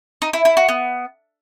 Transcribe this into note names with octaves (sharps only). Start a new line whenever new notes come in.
D#4
E4
E4
F#4
B3